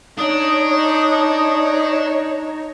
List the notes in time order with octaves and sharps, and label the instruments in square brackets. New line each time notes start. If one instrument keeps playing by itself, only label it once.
[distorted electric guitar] D4 [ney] D#4 [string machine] C#5 [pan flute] D#6